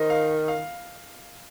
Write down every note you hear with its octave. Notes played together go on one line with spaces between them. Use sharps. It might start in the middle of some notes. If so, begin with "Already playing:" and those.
Already playing: D#3 A#4 C5 D#5
F5
F5